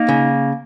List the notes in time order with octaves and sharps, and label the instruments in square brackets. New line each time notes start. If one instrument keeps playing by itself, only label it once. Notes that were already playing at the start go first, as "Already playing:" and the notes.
Already playing: [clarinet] A#3 [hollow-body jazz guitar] D#4
[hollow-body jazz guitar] C#3